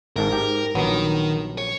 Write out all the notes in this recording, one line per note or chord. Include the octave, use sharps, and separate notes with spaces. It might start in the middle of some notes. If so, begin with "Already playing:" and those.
G#1 G#2 A#4 A5
G#2 G4
A#1 D#3 F#3 B3 A#4
C#5